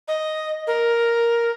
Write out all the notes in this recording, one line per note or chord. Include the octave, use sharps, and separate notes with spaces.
D#5
A#4